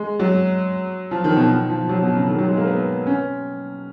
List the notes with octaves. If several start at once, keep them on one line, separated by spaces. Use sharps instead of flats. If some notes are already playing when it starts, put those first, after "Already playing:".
Already playing: G#3
F#3
F3
D#3
B2
D#3
F3
F#3
B2
C#3
D#3
F#3
G#3
A#3
B3
C#4